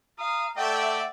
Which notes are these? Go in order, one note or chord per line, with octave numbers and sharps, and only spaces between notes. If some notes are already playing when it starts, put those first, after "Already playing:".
F5 A#5 D#6
A3 D5 E5 F#5 G5